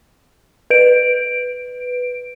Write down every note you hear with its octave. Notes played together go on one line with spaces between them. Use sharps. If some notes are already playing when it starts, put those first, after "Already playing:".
B4 D7